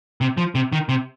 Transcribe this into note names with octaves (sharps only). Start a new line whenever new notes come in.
C3
F3
C3
D#3
C3